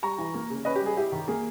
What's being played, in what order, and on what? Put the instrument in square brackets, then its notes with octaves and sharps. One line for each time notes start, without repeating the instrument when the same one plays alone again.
[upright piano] G3 A#5 C#6
E3
A#3
C#3
C#4 B4 D#5
G4
G3 G#4
E4 G4
D#3
A#3 G#4